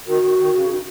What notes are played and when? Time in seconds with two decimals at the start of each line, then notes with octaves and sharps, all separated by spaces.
0.07 D#3 F#4
0.23 D#3
0.38 D#3
0.54 C#3
0.70 D#3